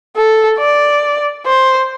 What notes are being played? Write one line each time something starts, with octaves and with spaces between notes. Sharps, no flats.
A4
D5
C5